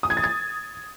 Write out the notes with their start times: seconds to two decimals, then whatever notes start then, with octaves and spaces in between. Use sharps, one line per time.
0.03 D#6
0.10 G#6
0.17 A6
0.24 G#6